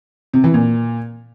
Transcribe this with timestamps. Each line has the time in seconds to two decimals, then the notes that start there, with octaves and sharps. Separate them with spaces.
0.33 C3
0.44 E3
0.54 A#2